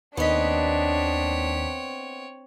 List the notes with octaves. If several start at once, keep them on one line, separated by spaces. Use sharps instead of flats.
D#2 B3 C4 D4 C#5 D#5 B6